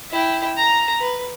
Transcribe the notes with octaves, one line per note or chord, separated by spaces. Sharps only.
E4 G5
A#5
B4